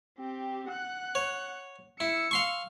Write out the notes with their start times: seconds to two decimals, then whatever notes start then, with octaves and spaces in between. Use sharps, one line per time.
0.18 C4 G4
0.69 F#5 F#6
1.15 C#5
2.00 E4 E6 C#7
2.31 F5 C6 C#6